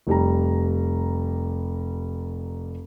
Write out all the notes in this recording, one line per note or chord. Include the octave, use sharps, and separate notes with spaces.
F1 G3 A#5